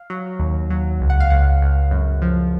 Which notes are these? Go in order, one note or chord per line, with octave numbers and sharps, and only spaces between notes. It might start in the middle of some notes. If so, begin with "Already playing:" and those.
Already playing: F5
F#3
D#2
F#3
C#2
F#5
F5
C#2 F#5
C#2
F#2
F3